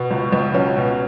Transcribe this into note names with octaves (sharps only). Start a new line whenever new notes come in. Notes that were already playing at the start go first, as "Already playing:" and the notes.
Already playing: B2 B3
C#2
C#2
F#3 C#4
B2